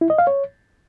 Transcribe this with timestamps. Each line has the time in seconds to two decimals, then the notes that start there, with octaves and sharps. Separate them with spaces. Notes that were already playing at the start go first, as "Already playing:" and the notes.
0.01 E4
0.10 D#5
0.18 F5
0.27 C#5